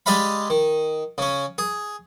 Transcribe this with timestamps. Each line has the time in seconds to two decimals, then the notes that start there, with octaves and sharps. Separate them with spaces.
0.06 G#3 G4 D5 D#5 F5 B5
0.50 D#3
1.18 C#3 C#4
1.58 G#4